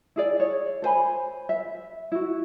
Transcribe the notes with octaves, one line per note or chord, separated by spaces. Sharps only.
E4 G#4 D5
C#5
A4 C5 G#5 B5
E5
E4 F#4